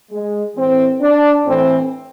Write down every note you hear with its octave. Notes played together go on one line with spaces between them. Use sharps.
G#3
A2 E3 C4
D4
A2 E3 C4